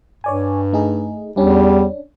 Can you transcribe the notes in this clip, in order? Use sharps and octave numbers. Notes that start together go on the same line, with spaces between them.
G2 C#5 D5 G#5
A3 D#4 G#4
E2 G3 C#4 D4